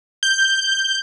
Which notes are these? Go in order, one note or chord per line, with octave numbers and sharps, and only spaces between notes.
G6